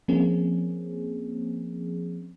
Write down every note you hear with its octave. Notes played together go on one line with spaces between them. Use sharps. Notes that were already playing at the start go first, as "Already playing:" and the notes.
F3 A#3 C4 C#4 G#4